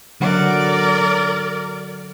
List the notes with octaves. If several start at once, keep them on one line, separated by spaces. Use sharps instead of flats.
D3 F#3 A#4 D5 F#5